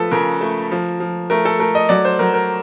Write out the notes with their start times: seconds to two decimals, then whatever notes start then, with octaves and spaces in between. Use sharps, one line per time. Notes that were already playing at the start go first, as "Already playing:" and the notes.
Already playing: F3 A3 A4 B4
0.11 C#3 A#4
0.41 A3
0.71 F3
1.00 F3
1.30 A3 A#4
1.45 A4
1.59 A3 A#4
1.75 D#5
1.89 F#3 D5
2.05 C5
2.19 F#3 A#4
2.34 A#4